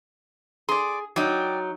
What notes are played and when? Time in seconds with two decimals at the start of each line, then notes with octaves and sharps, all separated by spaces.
0.69 G#4 D5 C6
1.16 F#3 D#4 D5 G5